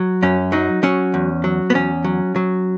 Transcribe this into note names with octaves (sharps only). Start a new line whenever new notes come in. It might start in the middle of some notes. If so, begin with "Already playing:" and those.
Already playing: F#3
F#2 C#4
F#3 D#4
F#3 C#4
E2
F#3
B3
E2 C#4
F#3
F#3